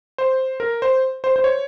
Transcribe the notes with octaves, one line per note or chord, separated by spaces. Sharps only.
C5
A#4
C5
C5
C5
C#5